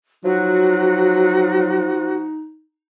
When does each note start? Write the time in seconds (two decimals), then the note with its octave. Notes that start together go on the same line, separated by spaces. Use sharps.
0.24 F3 F#3 D#4 F#4